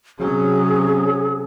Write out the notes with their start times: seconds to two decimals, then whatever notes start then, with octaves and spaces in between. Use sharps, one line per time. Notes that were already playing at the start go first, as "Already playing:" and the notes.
0.19 C3 F#3 C#4 G#4